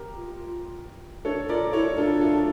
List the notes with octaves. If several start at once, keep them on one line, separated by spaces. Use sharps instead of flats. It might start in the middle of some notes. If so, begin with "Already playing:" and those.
Already playing: G4 A#4
F4
D4 A4 C#5
F4 A#4 D5
E4 A4 C#5
D4 F4 A4
F4 A4